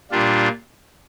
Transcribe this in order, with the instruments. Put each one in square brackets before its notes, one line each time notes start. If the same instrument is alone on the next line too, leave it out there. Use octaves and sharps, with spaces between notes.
[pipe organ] A#2 G3 D4 F4